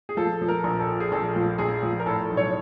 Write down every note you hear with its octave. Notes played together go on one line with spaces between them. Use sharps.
G#4
F3 A4
F3
A#4
A#1
A4
A#2
G#4
A#1 A4
F3
A#1 G#4
F3
A#4
A2 A4
B1
C#5